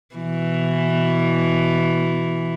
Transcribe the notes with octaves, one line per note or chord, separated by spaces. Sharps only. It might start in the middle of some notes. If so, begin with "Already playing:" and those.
B2 E3